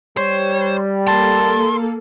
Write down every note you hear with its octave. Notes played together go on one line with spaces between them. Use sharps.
G3 C5 C#5
A#3 A4 A5 C6